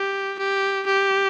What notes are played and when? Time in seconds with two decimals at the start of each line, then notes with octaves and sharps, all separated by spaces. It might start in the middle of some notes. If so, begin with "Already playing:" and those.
Already playing: G4
0.39 G4
0.87 G4